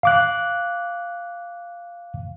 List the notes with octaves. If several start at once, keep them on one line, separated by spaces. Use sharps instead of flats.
F5 D6 F#6